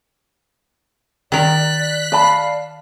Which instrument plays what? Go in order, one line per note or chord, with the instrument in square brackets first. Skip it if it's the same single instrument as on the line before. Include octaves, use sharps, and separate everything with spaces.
[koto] D#3 A#4 [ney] D5 [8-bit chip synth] F#6 B6
[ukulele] D5 A5 B5 [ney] F5